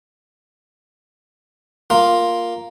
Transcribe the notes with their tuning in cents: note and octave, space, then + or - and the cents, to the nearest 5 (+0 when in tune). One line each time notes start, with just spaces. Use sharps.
A#3 +0 F4 +0